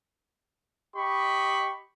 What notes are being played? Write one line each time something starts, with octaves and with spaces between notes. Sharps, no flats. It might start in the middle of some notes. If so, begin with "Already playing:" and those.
G4 D#5 B5 C#6